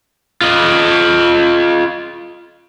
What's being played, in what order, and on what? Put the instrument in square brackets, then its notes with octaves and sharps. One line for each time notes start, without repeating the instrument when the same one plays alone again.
[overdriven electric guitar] F4 D#5